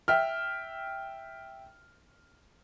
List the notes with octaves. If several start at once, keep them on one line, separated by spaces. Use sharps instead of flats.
E5 G5 F6